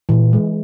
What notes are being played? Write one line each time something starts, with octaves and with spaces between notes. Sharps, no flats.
A#2 E3
G#3